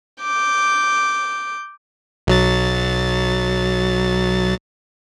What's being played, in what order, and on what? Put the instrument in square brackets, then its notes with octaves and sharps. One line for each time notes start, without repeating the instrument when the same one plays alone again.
[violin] D6 G6
[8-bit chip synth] B1 F#3 A6